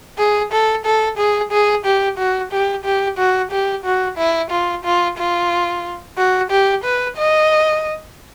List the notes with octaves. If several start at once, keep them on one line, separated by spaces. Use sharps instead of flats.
G#4
A4
A4
G#4
G#4
G4
F#4
G4
G4
F#4
G4
F#4
E4
F4
F4
F4
F#4
G4
B4
D#5